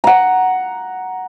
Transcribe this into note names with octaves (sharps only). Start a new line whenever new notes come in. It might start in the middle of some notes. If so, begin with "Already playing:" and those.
F#5 A#5